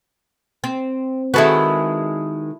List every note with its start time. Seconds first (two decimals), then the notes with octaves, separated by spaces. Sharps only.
0.64 C4
1.34 D#3 G#3 E4 F#4 A4 B4